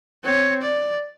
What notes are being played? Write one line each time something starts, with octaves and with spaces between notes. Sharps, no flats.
C4 C#5
D5